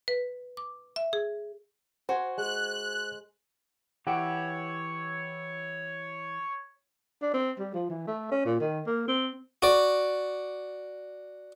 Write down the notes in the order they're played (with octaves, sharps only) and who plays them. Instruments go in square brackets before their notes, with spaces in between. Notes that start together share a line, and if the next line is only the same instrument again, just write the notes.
[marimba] B4
D6
E5
G#4
[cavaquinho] F#4 [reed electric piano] C5 [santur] G#5 C6
[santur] G#3 [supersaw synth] F#6
[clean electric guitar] E3 E4 [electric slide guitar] G4 F#5 G5 [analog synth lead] C#5
[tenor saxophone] D4
C4
G3
F3
E3
A3
C#4
A#2
D#3
A#3
C4
[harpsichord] F#4 D5